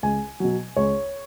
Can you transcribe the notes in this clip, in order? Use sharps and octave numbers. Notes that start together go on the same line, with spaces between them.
C#2 G#5
B2 F#3
C#2 C#5